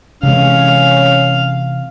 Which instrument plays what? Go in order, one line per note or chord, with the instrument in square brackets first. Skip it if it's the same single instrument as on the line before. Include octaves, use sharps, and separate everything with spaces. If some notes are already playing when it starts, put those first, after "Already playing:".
[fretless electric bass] C3 E3 G#3 [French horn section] C#4 [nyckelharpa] F5